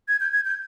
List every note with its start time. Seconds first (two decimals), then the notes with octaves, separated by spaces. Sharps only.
0.08 G#6
0.20 G6
0.33 G#6
0.45 G6